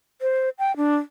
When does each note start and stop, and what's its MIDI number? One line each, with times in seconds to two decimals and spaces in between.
0.22 0.49 72
0.59 0.75 79
0.77 0.96 62